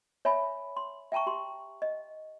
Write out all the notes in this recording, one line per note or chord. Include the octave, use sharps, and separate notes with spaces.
C#5 E5 G#5 B5
C6
E5 G5 A5 A#5 C#6
G4 C6
D#5